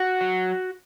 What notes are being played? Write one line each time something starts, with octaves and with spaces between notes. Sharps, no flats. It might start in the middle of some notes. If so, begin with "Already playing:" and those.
Already playing: F#4
F#3